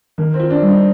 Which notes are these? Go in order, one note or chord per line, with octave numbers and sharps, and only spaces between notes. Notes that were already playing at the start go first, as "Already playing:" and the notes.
D#3 A#3
C4
F4
D4
G3
D#4